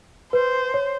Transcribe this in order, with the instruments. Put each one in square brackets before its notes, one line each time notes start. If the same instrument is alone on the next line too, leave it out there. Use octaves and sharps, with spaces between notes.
[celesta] B4 [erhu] C5
[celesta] C#5